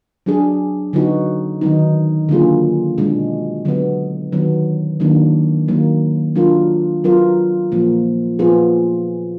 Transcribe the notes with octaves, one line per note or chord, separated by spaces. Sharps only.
F#3 D4 G#4
D3 F#3 B3 D#4 F#4
D#3 F#3 B3 D#4
D3 F#3 A#3 F4 G#4
B2 G#3 D4
D3 F#3 B3
D#3 F#3 B3
D#3 F#3 A#3 D4
D#3 F#3 A#3
F#3 D4 F4 A#4
F#3 B3 F4 A#4
A#2 F3 A#3
A#2 F3 B3 F4 G#4